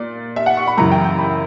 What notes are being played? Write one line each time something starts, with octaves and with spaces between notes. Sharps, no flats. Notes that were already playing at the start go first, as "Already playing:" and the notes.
Already playing: A#2 D5
E5
F#5
C#6
B5
F#2 C#3 E3 A#5
G5
G5
B5